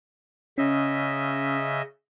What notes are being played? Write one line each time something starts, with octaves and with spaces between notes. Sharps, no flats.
C#3 C#4 D#5 E5